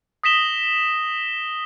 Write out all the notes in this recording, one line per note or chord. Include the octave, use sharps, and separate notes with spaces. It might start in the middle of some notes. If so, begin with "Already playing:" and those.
D#6 A#6 B6 E7 G7